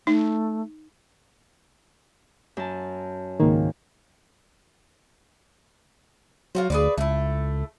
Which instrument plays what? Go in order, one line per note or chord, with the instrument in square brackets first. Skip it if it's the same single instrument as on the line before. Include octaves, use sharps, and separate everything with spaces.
[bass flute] A3 [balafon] D#4
[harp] F#2 A5
[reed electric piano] C#2 G#2 D#3 [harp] A#3
[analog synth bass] F#3 [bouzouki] F4 F#4 C5
[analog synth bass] D2 [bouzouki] G#4 B4 D5
[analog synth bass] C#2 [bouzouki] A3 E4